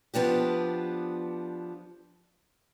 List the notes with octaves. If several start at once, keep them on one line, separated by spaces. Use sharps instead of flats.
F3 B3 D4 G4